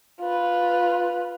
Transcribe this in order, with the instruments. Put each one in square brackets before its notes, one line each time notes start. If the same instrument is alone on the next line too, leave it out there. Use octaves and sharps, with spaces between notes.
[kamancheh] F4 B4